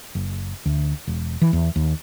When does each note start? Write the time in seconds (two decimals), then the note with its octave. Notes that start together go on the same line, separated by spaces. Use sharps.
0.15 F#1
0.66 D2
1.07 E1
1.42 E3
1.53 E2
1.76 D#2